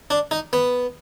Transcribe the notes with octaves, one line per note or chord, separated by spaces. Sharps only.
D4
D#4
B3